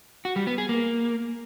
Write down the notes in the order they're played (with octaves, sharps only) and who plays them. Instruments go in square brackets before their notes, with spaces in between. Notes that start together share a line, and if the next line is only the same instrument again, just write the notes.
[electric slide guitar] F#4
G3
B3
G#4
A#3